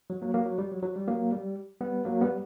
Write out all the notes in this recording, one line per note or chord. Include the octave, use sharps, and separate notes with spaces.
F#3
F#3 A#3
F#3 A#3
F#3
G3
F#3
F#3
G3
F#3 A#3
G3
G3 B3
F#3 A#3
G3 B3